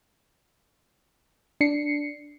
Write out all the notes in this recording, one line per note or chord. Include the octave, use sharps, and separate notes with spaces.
D4 C7 C#7